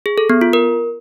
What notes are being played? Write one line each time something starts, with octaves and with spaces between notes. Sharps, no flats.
G#4
A4
B3
F4
A#4